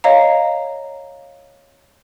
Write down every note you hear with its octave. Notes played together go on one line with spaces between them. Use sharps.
C#5 D#5 F5 A#5